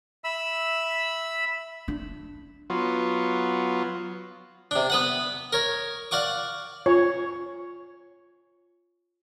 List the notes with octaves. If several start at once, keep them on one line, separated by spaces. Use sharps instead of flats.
E5 B5 E6
D4
F#3 B3 F4
C3 D4
B3 B4 F#5
A#4 C#5
D5 F5 F#5 C#6 D6
F4 C#5